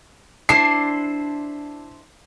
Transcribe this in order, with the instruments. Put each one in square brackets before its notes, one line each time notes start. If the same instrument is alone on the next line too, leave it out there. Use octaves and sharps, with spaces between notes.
[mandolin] D4 E4 C5 [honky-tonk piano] C7